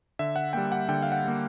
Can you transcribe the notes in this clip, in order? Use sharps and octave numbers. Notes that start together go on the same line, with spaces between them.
D3 E5
F#5
G3 A#3 G5
F#5
D3 G5
F5
F#5
G3 A#3